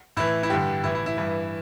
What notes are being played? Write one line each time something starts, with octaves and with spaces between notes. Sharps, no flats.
A2 E3 E4
E4
G2 D3 G4
A2 E3 E4
E4
E4
G2 E3